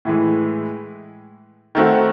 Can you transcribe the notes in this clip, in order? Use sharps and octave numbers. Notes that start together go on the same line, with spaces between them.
A2 E3 G#3
D#3 A3 C4 F#4